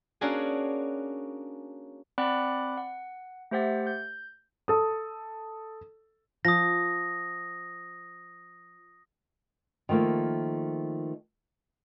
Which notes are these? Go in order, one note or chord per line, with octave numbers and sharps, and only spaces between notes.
A#3 C#4 D4 F#4 G#4
C4 D5 F#5 B5 D6 F#6
F#5
A3 G4 C5 E5 F#5 A6
G6
A4 D#6
F3 D#6 A#6
D#3 F3 A3 A#3